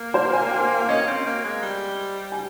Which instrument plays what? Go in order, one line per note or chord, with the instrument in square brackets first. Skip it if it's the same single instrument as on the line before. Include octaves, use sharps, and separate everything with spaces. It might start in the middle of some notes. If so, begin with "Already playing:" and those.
Already playing: [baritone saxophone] A#3
[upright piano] C5
G#5
G5
F5
[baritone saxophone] C#4 [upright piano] D#5
[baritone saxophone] C4
A#3
G#3
G3
[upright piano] G#5